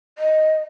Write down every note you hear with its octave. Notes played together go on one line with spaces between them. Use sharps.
D#5